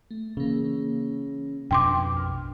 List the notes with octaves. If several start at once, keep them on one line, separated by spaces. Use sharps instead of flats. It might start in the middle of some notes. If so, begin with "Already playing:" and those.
A3
C#3 E3 A#3
F2 B2 D4 G5 C6 D6
A#1 F6